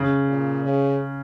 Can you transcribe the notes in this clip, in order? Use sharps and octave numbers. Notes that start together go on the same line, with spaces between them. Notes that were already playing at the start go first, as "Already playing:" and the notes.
Already playing: C#3
A#2
C#3